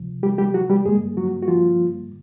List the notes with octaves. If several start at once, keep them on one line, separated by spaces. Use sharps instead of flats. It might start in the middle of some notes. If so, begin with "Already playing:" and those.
Already playing: C#2 C3 F3
G3 G4
G3 G4
F#3 F#4
G3 G4
G2 D3 G3 G#3 A#3 G#4
F#3 F#4
F#4
F3 F4